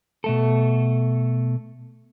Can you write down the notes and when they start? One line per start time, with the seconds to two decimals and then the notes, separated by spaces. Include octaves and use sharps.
0.24 B2 A3 A4